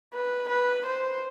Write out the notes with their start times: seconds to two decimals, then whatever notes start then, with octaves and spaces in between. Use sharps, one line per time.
0.14 B4
0.50 B4
0.87 C5